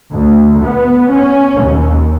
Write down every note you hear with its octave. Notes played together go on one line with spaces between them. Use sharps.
D2
B3
C#4
D#2